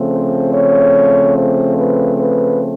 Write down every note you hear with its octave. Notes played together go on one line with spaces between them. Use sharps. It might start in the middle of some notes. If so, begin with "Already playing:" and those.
Already playing: C#3 F3 A3 C4
C5
C#5
C5
B4
B4